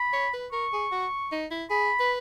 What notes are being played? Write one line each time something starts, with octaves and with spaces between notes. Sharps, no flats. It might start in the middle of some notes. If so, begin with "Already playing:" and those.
Already playing: B5
C#5
B4
A#4 C#6
G#4
F#4
D#4
E4
G#4 B5
B4